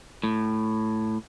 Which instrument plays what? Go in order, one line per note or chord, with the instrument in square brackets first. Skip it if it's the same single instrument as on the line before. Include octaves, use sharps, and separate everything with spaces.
[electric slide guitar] A2